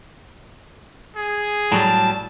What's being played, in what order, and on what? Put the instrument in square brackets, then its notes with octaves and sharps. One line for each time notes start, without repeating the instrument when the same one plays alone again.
[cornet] G#4
[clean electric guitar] A2 F#3 G3 [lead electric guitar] A5